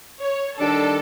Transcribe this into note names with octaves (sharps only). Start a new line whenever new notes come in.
C#5
D#3 G3 D4 A4